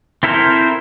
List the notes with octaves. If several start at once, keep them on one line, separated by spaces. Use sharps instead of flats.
C4 E4 A4 A#4 C5